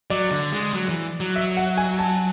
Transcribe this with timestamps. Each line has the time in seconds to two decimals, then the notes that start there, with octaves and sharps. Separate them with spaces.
0.10 F#3 D5
0.31 D3
0.52 G#3
0.73 F#3
0.89 E3
1.20 F#3
1.36 E5
1.57 F#5
1.77 G#5
1.99 A5